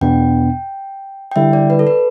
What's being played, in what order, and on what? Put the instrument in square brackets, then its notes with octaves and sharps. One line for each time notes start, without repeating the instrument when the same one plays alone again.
[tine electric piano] E2 B2 B3 D4 [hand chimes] G5
[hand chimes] G5
[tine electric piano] D3 G3 E4 [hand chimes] E5
[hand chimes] D5
B4
A4
B4